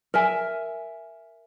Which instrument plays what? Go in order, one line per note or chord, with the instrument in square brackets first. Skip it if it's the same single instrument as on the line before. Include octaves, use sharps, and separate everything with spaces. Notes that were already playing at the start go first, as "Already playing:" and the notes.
[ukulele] A#4 E5 G#5